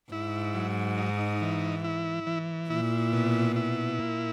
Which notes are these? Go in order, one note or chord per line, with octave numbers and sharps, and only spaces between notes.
G#2 E4
F#3
D#4
E3
E4
E3
A#2 E4
B2
E4
A#2